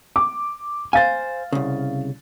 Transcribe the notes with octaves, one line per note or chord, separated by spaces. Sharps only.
D6
C5 F5 G#5 A6
C2 C#3